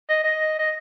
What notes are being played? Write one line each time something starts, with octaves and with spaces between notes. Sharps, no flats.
D#5
D#5
D#5